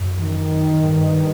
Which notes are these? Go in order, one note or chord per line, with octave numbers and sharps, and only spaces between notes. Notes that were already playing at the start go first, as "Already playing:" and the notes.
Already playing: F#2
D#3
G2